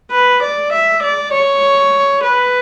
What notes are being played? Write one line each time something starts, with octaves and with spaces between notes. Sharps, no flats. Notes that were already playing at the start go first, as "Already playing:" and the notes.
B4
D5
E5
D5
C#5
B4